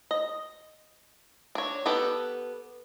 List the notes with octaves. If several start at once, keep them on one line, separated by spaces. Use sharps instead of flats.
D#5
D4 C#5
B3 G4 A4 B4